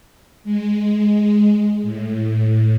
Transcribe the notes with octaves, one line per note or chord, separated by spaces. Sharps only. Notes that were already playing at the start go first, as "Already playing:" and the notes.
G#3
A2